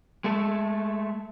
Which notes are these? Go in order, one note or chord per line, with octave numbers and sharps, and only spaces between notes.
G#3 A3 A4